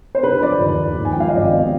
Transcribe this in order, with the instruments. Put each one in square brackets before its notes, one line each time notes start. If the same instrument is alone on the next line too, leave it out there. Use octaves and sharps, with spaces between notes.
[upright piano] C5
D3 B4
F3 D5
D#2
D#2
G#2
G#5
G5
F3 F5
D#5
G#1 D5
B3